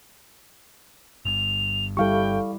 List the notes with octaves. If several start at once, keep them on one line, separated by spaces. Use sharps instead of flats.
G1 G2 F7
G3 E4 G4 A4 F5 G5 C#6